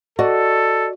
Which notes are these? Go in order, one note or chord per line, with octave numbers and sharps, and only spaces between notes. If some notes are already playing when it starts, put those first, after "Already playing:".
F#4 A4 D5 D#5